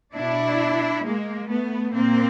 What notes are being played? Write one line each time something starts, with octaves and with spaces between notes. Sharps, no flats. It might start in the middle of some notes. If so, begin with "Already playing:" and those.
B2 D4 E4
G#3 A#3
A3 B3
A#2 A#3 C4